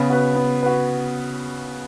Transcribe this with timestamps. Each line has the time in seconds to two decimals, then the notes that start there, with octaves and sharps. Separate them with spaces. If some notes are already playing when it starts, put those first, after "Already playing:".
Already playing: C#3 B3
0.10 F#4 B4
0.35 B3
0.63 F#4 B4